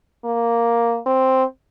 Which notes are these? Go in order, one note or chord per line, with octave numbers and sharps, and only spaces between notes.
A#3
C4